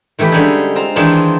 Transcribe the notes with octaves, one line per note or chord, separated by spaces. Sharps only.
D#3 E3 A3 G4 B4
D3 G3 G#3 C#4 D#4 G#4
C4 F4 A#5
D#3 E3 G#3 D4 D#4 F4